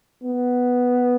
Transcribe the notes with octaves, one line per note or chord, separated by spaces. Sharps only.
B3